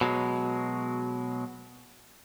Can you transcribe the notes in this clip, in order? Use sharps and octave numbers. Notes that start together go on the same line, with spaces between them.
B2 F#3 G#3